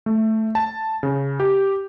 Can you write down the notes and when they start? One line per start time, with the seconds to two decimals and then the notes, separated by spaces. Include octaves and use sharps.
0.06 A3
0.55 A5
1.03 C#3
1.40 G4